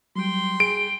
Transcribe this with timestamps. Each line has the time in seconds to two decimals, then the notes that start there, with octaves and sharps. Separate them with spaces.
0.16 F#3 G3 G5 C6
0.60 G#4 D7